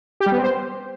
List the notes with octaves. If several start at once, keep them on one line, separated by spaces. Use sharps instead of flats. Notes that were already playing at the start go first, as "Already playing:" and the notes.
G4
G3
B3
C4
C5